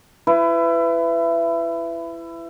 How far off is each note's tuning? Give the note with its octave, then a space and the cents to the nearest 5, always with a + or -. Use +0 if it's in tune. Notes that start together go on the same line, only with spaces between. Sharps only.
E4 +25 B4 +20